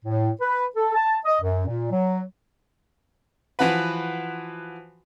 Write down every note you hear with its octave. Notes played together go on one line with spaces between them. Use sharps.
A2
B4
A4
A5
D#5
F#2
A#2
F#3
E3 F3 F#4 B4